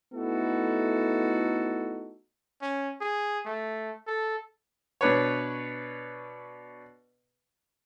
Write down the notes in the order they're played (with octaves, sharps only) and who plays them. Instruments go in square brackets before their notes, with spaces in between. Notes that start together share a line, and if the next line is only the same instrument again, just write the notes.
[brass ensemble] A3 B3 D#4 E4 F#4 A4
[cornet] C#4
G#4
A3
A4
[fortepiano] B2 D4 B4 C#5